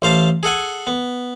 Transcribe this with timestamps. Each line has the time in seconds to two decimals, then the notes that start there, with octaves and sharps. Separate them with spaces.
0.02 A1 C5 F5 A5
0.43 G#4 A4 F#5 G#5
0.87 B3